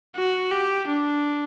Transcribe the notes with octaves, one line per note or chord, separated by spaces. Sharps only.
F#4
G4
D4